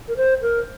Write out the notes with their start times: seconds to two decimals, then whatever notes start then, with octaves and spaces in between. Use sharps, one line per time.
0.08 A#4
0.17 C5
0.42 A#4